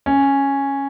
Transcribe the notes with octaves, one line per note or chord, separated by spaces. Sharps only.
C#4